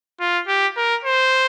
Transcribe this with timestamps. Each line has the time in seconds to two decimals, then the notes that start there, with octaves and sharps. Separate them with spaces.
0.20 F4
0.48 G4
0.77 A#4
1.04 C5